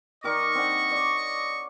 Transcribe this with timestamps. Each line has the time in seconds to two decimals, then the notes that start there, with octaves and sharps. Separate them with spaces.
0.24 D#3 A#4 D5 D#5 C#6
0.55 C4 D4 F#5
0.91 C#5 D5